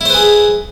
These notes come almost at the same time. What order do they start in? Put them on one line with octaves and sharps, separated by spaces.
E4 C5 B4 G#4